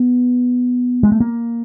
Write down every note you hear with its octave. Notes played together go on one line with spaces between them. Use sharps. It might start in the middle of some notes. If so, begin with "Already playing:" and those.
Already playing: B3
G#3
A3
A#3